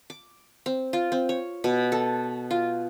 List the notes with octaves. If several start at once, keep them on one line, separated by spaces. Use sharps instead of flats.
D6
C4
F4
C4
C#5
B2
A4
F4